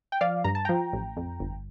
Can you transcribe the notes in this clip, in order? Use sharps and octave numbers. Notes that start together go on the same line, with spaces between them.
G5
F3 D5 F5
G2 A#5
A5
F3 G5 A#5
A1
F2
G1